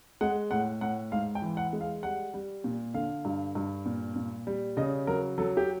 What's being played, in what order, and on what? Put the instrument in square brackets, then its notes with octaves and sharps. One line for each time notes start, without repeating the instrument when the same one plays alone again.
[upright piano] G#3 F#5
A2 F#5
A2 F#5
G#2 F5
G5
E3
F#5
G#3
F5
G3 F#5
G3
A#2
D3 F5
G2
G2
A#2
A#2
G3
C#3 D#5
F#3 A#4
F#3 A4
G4